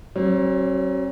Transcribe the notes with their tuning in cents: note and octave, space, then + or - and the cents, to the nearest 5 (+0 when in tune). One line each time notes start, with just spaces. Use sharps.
F#3 +35 C#4 -45 B4 +0